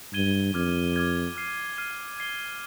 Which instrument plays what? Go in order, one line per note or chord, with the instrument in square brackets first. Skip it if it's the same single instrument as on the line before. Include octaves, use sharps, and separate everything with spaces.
[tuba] G2 [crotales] G#6 D#7 G7
[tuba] F2 [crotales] D6 F6 G#6
[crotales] D6 F6 G#6
F6 C7 D#7
F6 C7 D#7
G#6 C7 G7